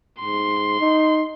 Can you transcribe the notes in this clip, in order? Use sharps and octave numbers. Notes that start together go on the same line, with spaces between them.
G#2 C6
D#4